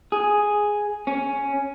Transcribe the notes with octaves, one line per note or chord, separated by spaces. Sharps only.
G#4
C#4